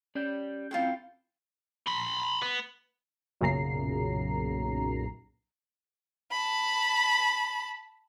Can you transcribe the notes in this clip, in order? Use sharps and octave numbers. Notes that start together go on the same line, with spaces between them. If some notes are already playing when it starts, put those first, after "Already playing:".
C#4 G4 D5 G6
C4 E4 F4 G#4 C5 G5
B5 C6
B3
B1 F#2 A#2 C#3 A#5 C7
A5 B5